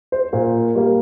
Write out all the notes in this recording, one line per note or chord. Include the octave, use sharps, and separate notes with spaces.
C5
A#2 A#4
G3 A#3